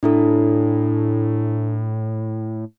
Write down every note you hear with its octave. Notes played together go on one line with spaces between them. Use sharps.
A2 D4 E4 A4